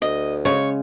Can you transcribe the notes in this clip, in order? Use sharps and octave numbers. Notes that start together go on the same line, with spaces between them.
D2 D#5
C#3 G#3 C#5